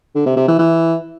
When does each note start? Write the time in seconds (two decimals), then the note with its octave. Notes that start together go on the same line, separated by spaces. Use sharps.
0.15 D3
0.26 C3
0.37 C3
0.48 E3
0.59 E3